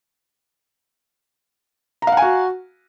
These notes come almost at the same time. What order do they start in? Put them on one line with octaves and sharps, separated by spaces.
A#5 F5 F#5 G#5 F#4